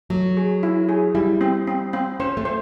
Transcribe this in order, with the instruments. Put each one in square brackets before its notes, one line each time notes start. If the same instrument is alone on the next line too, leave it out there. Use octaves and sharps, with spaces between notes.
[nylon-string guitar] F#3 [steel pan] A3
[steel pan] G#4
E4
G#4
[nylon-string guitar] G3 [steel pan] E4
[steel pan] C4
C4
C4
[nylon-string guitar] C#4 [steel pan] C5
[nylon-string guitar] A3
[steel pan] C5